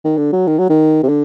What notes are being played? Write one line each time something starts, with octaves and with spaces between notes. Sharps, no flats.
D#3
D3
F#3
D#3
F#3
D#3
C3
D3